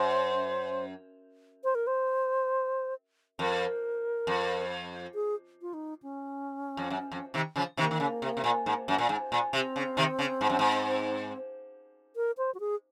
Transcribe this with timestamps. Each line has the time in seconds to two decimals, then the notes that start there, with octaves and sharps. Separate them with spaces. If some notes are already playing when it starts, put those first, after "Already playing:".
Already playing: F#2 C5
1.64 C5
1.75 A#4
1.87 C5
3.39 F2 A#4
4.27 F2
5.15 G#4
5.62 F4
5.74 D#4
6.03 C#4
6.77 F2
6.90 F#2
7.12 F2
7.34 C3 D#3
7.56 C#3 F3
7.77 C3 D#3 A#3
7.91 D#3
8.00 C#3
8.22 C3
8.37 C3
8.44 A#2
8.66 G#2
8.88 F#2
8.98 A#2
9.09 G#2
9.32 A#2
9.53 C3 C4
9.76 C#3
9.97 C3 D#3
10.19 C#3
10.41 G#2
10.49 F#2
10.59 G#2
12.16 A#4
12.38 C5
12.54 F#4
12.60 G#4